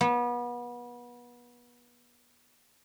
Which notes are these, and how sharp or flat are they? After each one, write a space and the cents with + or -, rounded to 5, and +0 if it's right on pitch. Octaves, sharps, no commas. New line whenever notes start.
B3 -30